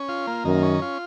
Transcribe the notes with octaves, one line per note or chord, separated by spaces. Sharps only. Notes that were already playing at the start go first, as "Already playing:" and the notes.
Already playing: C#4
F4
A#3
F#2 D#3
C#4
F4